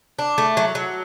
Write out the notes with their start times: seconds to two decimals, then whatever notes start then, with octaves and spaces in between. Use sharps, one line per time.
0.19 D4
0.38 A3
0.57 F#3
0.75 F#3